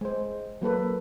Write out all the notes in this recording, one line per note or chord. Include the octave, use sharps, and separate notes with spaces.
G#3 C5
F#3 A#3 A4 B4